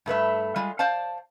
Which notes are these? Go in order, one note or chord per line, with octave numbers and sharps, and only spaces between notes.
G2 A3 B4 E5
G3 G#3 F4
C5 D5 F5 A5